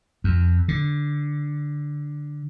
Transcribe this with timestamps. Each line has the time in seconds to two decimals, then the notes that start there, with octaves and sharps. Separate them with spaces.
0.24 F2
0.68 D3